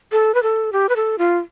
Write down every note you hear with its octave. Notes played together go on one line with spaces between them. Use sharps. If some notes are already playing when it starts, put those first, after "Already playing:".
A4
B4
A4
G4
B4
A4
F4